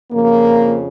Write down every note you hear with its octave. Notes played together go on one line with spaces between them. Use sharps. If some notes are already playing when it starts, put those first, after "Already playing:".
F2 C#3 F3 A#3